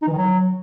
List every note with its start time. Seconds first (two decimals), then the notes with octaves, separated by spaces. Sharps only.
0.02 D#4
0.07 E3
0.12 D#3
0.18 F#3